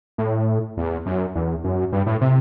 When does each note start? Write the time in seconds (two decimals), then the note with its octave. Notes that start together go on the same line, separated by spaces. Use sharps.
0.18 A2
0.77 E2
1.06 F#2
1.35 E2
1.64 F#2
1.92 G2
2.06 A2
2.21 C3